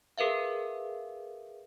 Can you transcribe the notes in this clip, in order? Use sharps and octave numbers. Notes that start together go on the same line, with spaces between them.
G#4 A#4 B4 E5 F5